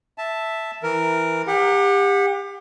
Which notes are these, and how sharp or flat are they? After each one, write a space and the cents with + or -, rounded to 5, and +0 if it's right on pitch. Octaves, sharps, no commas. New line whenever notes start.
E5 +0 A5 +0
E3 +0 A#4 +0
G4 +30 F#5 -20